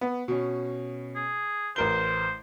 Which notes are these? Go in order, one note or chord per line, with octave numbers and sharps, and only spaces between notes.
B3
B2 C#4
G#4
A1 A#4 C5 G7